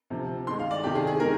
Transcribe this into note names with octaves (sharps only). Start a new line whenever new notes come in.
D2 C3 F3
G2 D#3 G#3 C6
F5
D5
F2 C3 D#3 G4
G#4
G#4
D#3 G#3 A#4